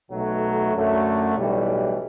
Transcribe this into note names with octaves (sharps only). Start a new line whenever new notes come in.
B1 B2 F#3 A3
F#2 D3 F#3 A3
B1 A2 E3 G3